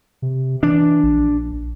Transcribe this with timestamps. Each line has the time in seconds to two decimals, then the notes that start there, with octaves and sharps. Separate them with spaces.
0.22 C3
0.63 E3 D4
1.03 A#1